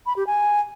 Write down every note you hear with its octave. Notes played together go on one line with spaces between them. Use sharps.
B5
G4
G#5